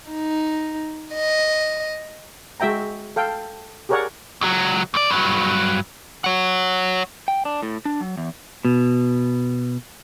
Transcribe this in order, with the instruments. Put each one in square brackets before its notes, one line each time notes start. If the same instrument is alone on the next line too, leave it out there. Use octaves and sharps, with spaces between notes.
[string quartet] D#4
D#5
[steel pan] G#3 F#4 E5 G5 A#5
A4 F5 G5
G4 G#4 A#4 C#5 D5 F#5
[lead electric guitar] C#2 F#3
D2 D5
G2 F#3
C#5 F#5
[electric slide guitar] G5
D4
A2
D4
F#3
E2
[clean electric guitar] B2